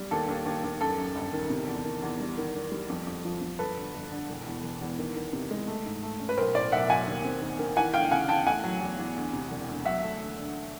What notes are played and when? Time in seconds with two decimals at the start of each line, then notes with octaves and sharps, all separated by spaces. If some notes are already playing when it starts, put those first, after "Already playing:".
Already playing: G3
0.11 D#2 A4
0.28 D#2
0.46 D#2
0.64 D#2
0.81 F#2 A4
0.98 F#2
1.15 G1
1.33 D#3
1.50 C3
1.67 E2
1.84 D#3
2.02 E2
2.20 G3
2.37 D#3
2.55 D#3
2.72 G3
2.89 F2
3.07 F2
3.25 F3
3.41 F2
3.59 G1 A4 B4
3.77 D3
3.94 G1
4.11 D3
4.29 E1
4.46 E2
4.63 E1
4.81 E2
4.99 D#3
5.16 D#3
5.33 C3
5.51 G#3
5.67 A3
5.85 G#2
6.03 A3
6.20 C#4
6.29 B4
6.37 B1 A#4 C5
6.55 A2 C5 D5
6.72 B1 E5 F#5
6.90 F#3 F#5 G#5
7.07 D#2
7.25 C4
7.42 D#3
7.59 D#3
7.77 E3 F#5 G#5
7.94 D2 F5 G5
8.11 C#3 F#5 G#5
8.29 E3 G5 A5
8.46 A3 F#5 G#5
8.64 F#3
8.81 E2
8.99 E2
9.16 D2
9.33 C3
9.51 E1
9.68 D2
9.85 F#3 E5 F#5
10.03 A3
10.21 D3
10.38 D3